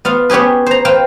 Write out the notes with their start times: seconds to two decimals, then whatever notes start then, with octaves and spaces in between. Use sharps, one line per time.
0.05 B3 F4 F5
0.30 B3 C#4 G4 G#4 B4
0.66 C5 A#5
0.85 B4 C5 F5 G5